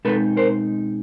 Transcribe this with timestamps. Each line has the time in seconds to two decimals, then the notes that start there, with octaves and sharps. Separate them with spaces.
0.05 B2 G#3 C4 D#4 A4 B4
0.37 A#4 C5